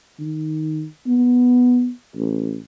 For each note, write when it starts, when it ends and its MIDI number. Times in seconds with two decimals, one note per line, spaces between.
0.19 0.84 51
1.07 1.89 59
2.16 2.57 33